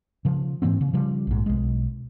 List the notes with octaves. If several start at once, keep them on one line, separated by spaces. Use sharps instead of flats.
C#3 F3
G#2 E3 A#3 C4
C#3
C#3 F3 G3
A#1 G#2
B1 G#3